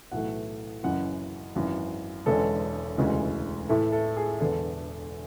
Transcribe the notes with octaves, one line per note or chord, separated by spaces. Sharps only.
B1 A2 E3 A3 F#5
F#1 F#2 C#3 E3 F#5
G#1 F#2 E3
E1 E2 D3 G#3 C#4 A4
E1 D2 C#3 E3 G#3
A2 E3 A3 E4 A4
A4
G#4
E1 E2 D3 A4